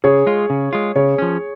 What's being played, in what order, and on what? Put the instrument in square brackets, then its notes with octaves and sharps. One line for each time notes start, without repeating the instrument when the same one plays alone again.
[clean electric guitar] C#3 [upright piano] G#4 C#5
[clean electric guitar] G#3 F4
C#3
G#3 F4
[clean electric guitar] C#3 [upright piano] G#4 C#5
[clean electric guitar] F3 C#4